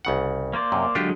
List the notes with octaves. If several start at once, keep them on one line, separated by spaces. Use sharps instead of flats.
C2 C#3 F#5
A#3 C5 D5
F#2 C3
D3 F#3 G#3 D4 F4 G4